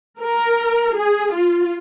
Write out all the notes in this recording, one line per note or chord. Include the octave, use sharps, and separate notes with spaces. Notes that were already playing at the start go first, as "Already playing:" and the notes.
A#4
G#4
F4